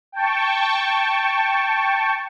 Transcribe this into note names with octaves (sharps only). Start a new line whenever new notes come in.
G5 A5 C#6